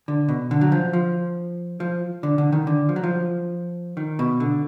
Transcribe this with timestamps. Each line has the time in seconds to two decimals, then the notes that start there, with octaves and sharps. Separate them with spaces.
0.08 D3
0.28 B2
0.51 D3
0.61 F#3
0.72 F3
0.93 F3
1.80 F3
2.23 D3
2.38 D3
2.52 D#3
2.67 D3
2.89 F3
2.96 F#3
3.04 F3
3.97 D#3
4.19 B2
4.40 D3